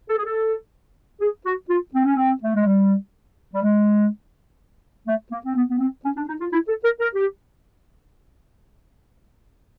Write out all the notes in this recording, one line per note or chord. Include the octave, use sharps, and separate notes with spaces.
A4
G#4
A4
G#4
F#4
F4
C4
C#4
C4
A3
G#3
G3
G3
G#3
A3
A#3
C4
B3
B3
C4
C#4
D4
D#4
F4
E4
A4
A#4
A#4
G4